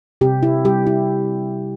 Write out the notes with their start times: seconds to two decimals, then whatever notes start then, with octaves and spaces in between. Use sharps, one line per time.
0.21 C3 G4
0.43 E4
0.65 G3 G4
0.87 E4